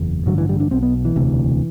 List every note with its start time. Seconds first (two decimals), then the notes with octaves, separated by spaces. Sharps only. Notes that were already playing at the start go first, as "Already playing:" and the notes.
Already playing: F#1 E2
0.26 A1 G2 D3 F#3
0.38 E3
0.49 G3
0.60 D4
0.71 B1 B2 C4
0.83 B3
1.05 E3
1.16 E1 D2 C3